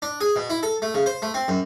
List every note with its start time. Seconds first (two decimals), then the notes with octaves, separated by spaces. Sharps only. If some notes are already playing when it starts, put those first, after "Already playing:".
0.02 D4
0.21 G#4
0.36 B2
0.50 E4
0.63 A4
0.82 A3
0.94 C#3
1.06 C5
1.22 A3
1.34 C4
1.48 F#2